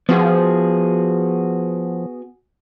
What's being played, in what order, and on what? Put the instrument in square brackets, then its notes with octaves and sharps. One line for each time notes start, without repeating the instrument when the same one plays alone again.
[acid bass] F3 [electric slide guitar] B3 F#4 G#4